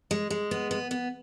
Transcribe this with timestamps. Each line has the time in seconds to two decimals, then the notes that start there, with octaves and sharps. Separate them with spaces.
0.11 G#3
0.30 G#3
0.51 B3
0.71 B3
0.91 B3